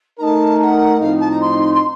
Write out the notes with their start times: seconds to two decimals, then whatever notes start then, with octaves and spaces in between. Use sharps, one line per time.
0.19 A3 D#4 A#4 A5 A#5
0.59 A5
0.63 F#5
1.00 A2 F3 C4 D#4 F5
1.20 A5
1.31 A#5
1.41 C6
1.74 C6